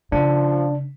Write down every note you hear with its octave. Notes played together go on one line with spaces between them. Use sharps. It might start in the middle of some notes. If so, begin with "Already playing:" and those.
C#3 F3 D4